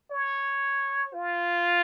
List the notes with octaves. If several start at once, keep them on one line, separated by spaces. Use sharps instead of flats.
C#5
F4